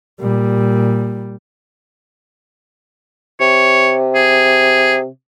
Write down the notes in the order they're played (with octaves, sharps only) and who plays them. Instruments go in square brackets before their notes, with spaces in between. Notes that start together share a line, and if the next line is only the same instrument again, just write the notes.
[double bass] A#2 G3
[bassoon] C3 [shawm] C#5
[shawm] G#4